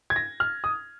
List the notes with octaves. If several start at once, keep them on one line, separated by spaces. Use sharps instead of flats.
G#6
A#6
F6
D#6